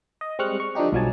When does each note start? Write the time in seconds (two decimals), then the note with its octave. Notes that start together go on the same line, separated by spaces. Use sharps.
0.21 D#5
0.39 G3 G#3 C4 C#6 F6 F#6
0.60 C#6
0.75 D3 F3 D4 D#4 G4
0.92 B1 G2 F3 F#3 G#5 A5